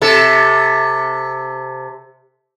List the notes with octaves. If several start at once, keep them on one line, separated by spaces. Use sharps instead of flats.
C3 A4